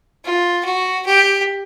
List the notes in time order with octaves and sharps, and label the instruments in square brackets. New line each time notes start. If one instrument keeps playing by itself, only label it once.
[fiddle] F4
F#4
G4